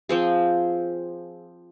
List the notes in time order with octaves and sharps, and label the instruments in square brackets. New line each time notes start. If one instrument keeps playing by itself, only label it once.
[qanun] F3 C4 G#4